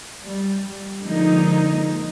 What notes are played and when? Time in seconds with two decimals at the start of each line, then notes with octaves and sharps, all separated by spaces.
0.23 G3
1.02 D3 F3 G#3 A#3 D#4